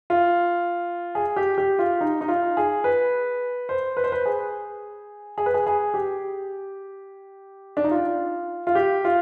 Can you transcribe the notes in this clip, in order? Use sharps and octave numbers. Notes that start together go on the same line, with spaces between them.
F4
G#4
G4
G4
F4
D#4
D#4
F4
G#4
B4
C5
B4
C5
B4
G#4
G#4
B4
G#4
G#4
G4
D4
D#4
F4
F4
G4
F4